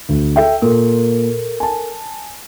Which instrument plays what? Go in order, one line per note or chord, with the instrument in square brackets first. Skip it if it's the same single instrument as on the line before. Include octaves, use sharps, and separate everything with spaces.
[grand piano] D2
A4 E5 G5
[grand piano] A#2 [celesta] A4 A#4
[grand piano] G#5 A5